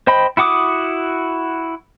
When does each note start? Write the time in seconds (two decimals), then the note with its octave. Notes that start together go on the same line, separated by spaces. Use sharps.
0.07 C5 D#5 G5 B5
0.37 E4 F#4 F#5 D6 D#6